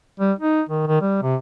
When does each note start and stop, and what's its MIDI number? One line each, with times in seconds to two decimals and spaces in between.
0.20 0.32 55
0.39 0.61 63
0.69 0.85 51
0.87 1.00 51
1.01 1.21 55
1.23 1.36 48